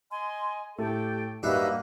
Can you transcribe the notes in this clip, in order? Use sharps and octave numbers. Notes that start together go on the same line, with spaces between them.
D#5 G#5 C6
A2 A3 G4 A4 G5
G2 A#3 D#4 F#4 B4 D#5 E5 E6